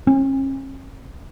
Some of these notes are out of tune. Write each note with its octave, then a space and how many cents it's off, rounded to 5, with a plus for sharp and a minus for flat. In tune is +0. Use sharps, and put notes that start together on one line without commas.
C#4 -45